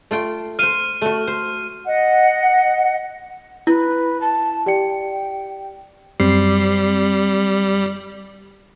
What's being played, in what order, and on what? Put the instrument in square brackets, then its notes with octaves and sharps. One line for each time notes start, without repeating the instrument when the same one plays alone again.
[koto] A3 F4 G5
[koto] C5 F5 [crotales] F6 D#7
[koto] A3 F#4
C5
[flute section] D#5 F#5
[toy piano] E4 [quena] B4
[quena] A5
[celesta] G4 D5 C#7 [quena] G5
[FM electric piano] F#2 C4 C7 [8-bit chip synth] G3